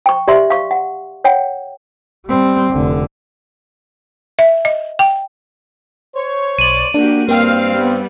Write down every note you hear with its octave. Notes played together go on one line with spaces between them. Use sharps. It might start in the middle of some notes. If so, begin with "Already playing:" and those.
G5 C#6
G4 D5 E5 C6
F5 C#6
F#5
C#5 F#5 G5
G3 C4
F1 D3
E5
D#5
G5
C5 C#5
B1 D5 D#7 F#7
A#3 D4 F#4 G4
G2 A#3 C4 F5 G5
G3 B3